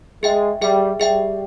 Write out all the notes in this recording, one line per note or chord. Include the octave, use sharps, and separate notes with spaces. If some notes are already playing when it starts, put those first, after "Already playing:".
G#3 G#4 E5 G5
G3 G#4 E5 G5
G3 G#4 E5 G5